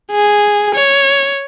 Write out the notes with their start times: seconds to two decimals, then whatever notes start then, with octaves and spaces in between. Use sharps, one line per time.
0.11 G#4
0.75 C#5